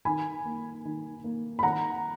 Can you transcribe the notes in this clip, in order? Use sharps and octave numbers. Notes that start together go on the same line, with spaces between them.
D#3 G#5 B5
A#3
D#3
A#3
B5
D#3 F#5 A#5